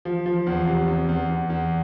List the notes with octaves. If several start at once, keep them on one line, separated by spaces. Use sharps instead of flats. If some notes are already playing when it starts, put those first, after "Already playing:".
F3
F3
E2
C3
E2
E2
E2
E2